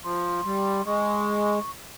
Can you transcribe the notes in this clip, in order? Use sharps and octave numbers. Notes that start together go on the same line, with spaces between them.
F3 C6
G3
G#3 C#6